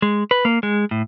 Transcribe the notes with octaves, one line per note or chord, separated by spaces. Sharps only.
G#3
B4
A#3
G#3
A2